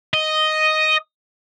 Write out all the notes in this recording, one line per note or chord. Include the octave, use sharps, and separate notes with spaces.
D#5